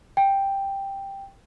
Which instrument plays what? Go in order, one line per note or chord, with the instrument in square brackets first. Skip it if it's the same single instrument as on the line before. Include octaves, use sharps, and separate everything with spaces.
[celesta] G5